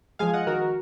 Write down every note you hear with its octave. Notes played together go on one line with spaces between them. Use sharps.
F3 G#3 F5 G#5
D#5 F#5
D#3 F#4 A#4